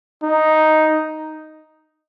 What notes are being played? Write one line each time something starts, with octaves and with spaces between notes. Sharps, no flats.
D#4